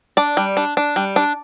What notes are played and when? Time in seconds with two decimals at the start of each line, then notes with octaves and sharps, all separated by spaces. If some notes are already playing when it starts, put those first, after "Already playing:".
0.17 D4 D5
0.37 G3
0.57 D4
0.77 D4
0.96 G3
1.16 D4